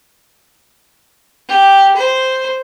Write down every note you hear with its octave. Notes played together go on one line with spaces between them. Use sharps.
G4
C5